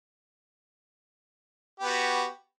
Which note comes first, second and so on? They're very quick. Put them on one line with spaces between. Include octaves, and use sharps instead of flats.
G4 B3 F#4